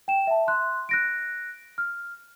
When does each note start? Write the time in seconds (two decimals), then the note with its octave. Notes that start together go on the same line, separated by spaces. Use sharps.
0.08 G5 E7
0.27 E5 A5
0.47 C6 F#6
0.89 F#6 A#6 D7
1.78 F6